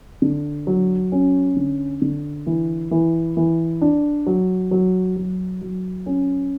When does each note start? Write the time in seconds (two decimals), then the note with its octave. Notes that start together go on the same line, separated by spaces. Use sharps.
0.22 D3
0.67 F#3
1.12 C#4
1.57 D3
2.02 D3
2.47 E3
2.91 E3
3.37 E3
3.82 D4
4.27 F#3
4.71 F#3
5.16 F#3
5.61 F#3
6.06 C#4